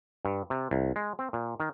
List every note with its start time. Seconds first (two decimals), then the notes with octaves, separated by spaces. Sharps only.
0.25 G2
0.50 C3
0.71 C2
0.96 G#3
1.19 C4
1.33 A#2
1.60 D#3